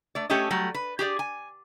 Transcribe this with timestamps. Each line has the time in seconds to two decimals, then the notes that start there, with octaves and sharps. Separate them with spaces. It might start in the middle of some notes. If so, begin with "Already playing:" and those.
0.15 A3 D5
0.30 A3 C#4 G4 A4 C#5 D#5
0.50 F#3 G3 A3
0.74 B4
0.99 G4 G#4 C5 D5
1.19 G#5